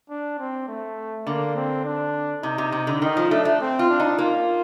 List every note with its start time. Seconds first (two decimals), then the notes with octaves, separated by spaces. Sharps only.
0.10 D4
0.39 C4
0.68 A3
1.27 D3 A#3
1.56 C4
1.85 D4
2.43 C3 D#4
2.58 C3
2.72 C3
2.87 D3
3.02 D#3 D#4
3.17 F3
3.31 A3 D4
3.45 A3
3.61 C4
3.79 F4
3.90 D4
4.00 D#4
4.18 A#3 F4